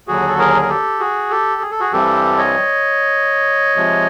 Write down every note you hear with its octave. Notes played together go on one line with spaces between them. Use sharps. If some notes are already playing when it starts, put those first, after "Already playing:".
D#2 D3 F#3 F#4 G#4
A4
G#4 A#4
A#4
G4 A4
F#4 G#4
G4 A4
G#4
A4
F#4 G#4
G2 E3 G3 C4 G4 A4
C#5 D#5
C3 F3 G#3